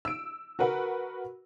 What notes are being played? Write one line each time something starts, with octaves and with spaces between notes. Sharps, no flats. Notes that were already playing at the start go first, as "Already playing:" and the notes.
E6 D7
F#4 A#4 B4 F#5